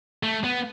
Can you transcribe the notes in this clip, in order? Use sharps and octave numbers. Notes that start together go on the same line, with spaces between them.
A3
B3